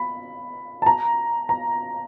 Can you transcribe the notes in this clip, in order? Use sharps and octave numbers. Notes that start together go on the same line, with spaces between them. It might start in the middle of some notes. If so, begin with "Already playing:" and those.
Already playing: B5
A5
A#5
A#5